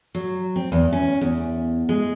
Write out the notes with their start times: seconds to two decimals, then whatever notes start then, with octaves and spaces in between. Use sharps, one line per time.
0.15 F#3
0.56 C4
0.72 E2
0.93 C#4
1.21 E2
1.89 G#3